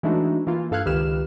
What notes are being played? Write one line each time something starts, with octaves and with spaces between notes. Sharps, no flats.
E3 G#3 A3 D4 D#4 F#4
E3 A#3 F4
G2 A4 F5 F6 F#6 G#6
C#2 D#3 G4 B4 F6 E7